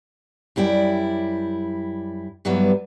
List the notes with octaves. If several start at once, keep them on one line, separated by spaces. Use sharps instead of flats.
F#2 G3 E4 D5 G5
G2 E3 F#3 G3 B3